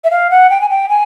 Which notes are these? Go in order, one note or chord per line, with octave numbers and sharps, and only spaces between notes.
E5
F5
F#5
G5
G#5
G5
G#5